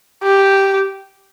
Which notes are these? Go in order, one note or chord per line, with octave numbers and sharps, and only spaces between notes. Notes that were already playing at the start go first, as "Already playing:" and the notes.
G4